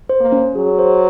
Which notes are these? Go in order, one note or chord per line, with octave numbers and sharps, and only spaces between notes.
C5
A#3
C#4
F#3 G#4
C5